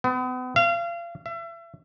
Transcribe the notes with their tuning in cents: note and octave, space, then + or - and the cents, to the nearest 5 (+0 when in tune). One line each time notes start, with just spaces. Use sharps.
B3 +40
F5 -35
E5 +35